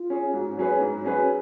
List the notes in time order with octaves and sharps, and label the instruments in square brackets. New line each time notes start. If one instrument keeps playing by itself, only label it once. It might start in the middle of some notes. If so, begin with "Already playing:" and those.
Already playing: [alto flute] F4
[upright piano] C#4 G#4
[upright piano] G#2 [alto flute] F#4
[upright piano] F#3 C#4 G#4 B4 [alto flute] F#4
[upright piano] G#2
F#3 C#4 G#4 B4